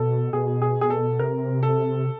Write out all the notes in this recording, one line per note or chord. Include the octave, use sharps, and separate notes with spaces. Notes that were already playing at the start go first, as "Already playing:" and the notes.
Already playing: B2 A4
B2 G#4
G#4
G#4
A4
C3 A#4
A4